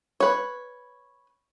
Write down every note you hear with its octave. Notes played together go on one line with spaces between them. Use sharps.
B4 C#5